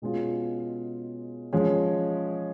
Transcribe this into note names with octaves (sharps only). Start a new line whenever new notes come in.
B2 G#3 C#4 F4
F3 G#3 C#4